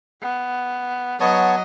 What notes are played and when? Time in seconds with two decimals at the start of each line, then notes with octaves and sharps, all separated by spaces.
0.21 B3
1.20 F#3 B3 C#5 D#5 A5